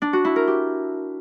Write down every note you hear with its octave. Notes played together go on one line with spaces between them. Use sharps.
D4
F#4
E4
A#4
G4